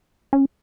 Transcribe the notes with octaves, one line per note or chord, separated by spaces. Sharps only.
C#4